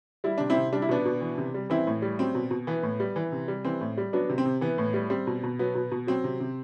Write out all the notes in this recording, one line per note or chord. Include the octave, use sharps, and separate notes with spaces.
G3 E4
C3 D4
C4 E4
C3
G3 D4
E4
B2 B3 D4
B2
E3
C3
G3
E3 C4 E4
A2
G3
F#3 C4
B2
B2
E3 B3
A2
G3
E3
C3
G3
E3 C4
A2
G3
F#3 B3 D4
C3
C4
C3
E3 B3
A2
G3
G3 C4
B2
B2
F#3 B3
B2
B2
F#3 C4
C3
C3